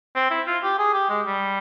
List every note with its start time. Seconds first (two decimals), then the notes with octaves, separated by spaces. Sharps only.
0.15 C4
0.30 E4
0.47 F4
0.63 G4
0.78 G#4
0.94 G4
1.09 G#3
1.27 G3